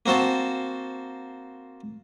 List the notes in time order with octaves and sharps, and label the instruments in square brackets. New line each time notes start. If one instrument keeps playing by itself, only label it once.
[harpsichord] A#3 C4 F#4 C5 A5